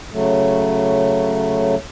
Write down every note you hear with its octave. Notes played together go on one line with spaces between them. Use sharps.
C#3 F#3 A3